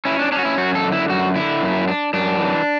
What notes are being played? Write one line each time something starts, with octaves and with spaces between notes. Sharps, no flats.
C#4 E4
D4
C#4 D4
F#4
E4
F#2 F#4
A4
D3
E4
F#2 F#4
D3 E4
F#2
D4
F#2 D4
E3